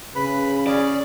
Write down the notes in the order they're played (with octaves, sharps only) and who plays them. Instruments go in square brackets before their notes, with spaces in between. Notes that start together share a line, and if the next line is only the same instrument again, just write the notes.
[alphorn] C#3 [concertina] B4 B5
[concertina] C#4 G#4 [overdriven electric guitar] D5